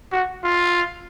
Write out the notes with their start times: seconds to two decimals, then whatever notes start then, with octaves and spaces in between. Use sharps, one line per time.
0.12 F#4
0.44 F4